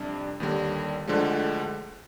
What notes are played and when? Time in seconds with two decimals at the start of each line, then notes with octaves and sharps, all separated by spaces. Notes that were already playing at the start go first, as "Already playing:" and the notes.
Already playing: F2 C3 G3 D4
0.40 D#2 D3 G3
1.07 D2 D3 F3 G#3